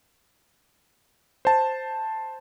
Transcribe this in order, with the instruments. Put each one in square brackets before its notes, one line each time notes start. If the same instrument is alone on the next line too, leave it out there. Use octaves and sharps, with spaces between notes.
[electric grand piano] C5 A5